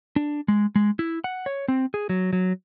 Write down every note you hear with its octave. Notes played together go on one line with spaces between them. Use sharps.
D4
G#3
G#3
E4
F#5
C#5
C4
G#4
F#3
F#3